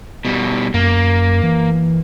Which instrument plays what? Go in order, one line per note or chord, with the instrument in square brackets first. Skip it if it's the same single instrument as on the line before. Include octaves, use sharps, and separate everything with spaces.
[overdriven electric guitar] B2 G3
[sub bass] F#2 [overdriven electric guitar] A#3
[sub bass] E3